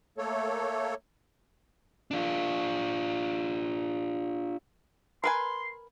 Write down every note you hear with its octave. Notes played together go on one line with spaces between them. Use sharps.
A3 A#3 A4 C#5
D4 F4
A#4 B4 G#5 C6